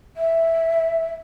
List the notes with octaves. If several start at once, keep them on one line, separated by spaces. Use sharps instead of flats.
E5